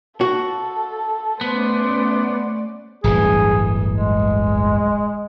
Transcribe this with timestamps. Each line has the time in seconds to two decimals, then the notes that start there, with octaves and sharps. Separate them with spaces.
0.21 F#4 A4 A5
1.41 A3 B3 C#4 C5 D5
3.04 D1 G1 E3 G#4
3.90 G#3